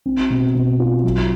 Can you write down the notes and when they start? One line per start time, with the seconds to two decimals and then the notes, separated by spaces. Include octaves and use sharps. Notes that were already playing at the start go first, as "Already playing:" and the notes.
0.06 C4
0.30 B2
0.55 B2
0.79 F4
1.04 F#3